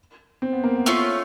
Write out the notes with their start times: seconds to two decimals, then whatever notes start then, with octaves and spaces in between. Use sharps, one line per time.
0.42 C4
0.53 B3
0.64 A#3
0.75 B3
0.86 A3 C#4 F4